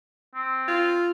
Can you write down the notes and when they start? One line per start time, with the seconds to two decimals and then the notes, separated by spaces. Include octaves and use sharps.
0.35 C4
0.68 F4